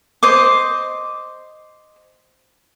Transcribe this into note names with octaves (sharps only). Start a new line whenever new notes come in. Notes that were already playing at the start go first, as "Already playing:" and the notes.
C5 D#5 D6